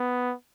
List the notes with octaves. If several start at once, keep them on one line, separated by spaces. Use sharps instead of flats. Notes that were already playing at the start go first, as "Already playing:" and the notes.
Already playing: B3